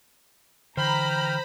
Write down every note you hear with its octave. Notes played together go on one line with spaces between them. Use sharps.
D3 E3 C5 G5 A#5 B5 F6